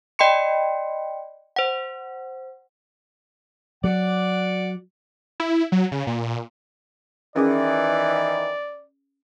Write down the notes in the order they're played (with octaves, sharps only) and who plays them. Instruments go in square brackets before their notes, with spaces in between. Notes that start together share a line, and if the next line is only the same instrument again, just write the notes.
[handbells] D5 D#5 G5 B5 C6 C#7
C5 F#5
[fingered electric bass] F#3 [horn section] D5 F#5
[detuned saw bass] E4
F#3
C#3
A#2
[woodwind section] D#3 E3 [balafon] C#4 G#4 D6 [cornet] D5